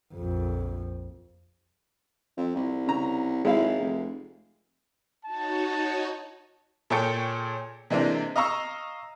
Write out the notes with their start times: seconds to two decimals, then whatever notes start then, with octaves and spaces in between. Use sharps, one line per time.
0.14 A#1 F2
2.37 F2
2.56 C2
2.87 C#3 A#5
3.45 G#1 G#3 E4 F5
3.80 F1
5.25 D#4 F#4 C#5 A5
6.90 A#2 G#4 A4 C#5 G5 C#7
7.90 C3 E3 G#3 A#3 C4 D4
8.36 D#5 F5 A#5 C#6 E6